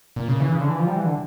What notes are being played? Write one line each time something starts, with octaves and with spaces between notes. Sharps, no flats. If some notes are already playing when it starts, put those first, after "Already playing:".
A#2
C#3
E3
C#3
D3
E3
F3
G3
E3
D3